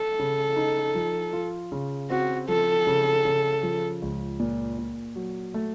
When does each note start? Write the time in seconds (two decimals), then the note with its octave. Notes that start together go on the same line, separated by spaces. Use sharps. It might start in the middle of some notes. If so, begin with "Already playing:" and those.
Already playing: A4
0.19 C#3
0.57 D#4
0.95 F3
1.33 F4
1.72 C#3
2.10 C4 F#4
2.48 F3 A4
2.87 C#3
3.25 C#3
3.63 F3
4.02 C#2
4.39 A#2
4.78 A#2
5.16 F#3
5.54 A3